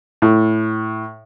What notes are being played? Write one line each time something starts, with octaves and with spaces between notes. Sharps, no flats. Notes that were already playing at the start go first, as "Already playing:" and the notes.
A2